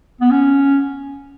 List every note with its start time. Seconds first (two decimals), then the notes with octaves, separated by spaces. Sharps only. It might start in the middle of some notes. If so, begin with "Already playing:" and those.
0.21 B3
0.31 C#4